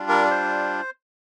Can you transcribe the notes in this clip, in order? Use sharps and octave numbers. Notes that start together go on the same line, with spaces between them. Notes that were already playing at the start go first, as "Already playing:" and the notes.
Already playing: G3 D4 F4
A#4
C5